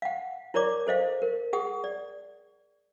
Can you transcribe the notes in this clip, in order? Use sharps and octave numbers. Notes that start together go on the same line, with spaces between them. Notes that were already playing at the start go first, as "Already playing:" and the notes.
F5 F#5
E4 A#4 C#5 D5 D6
A4 C5 D#5 F5
A#4
G#4 F#5 D#6
D5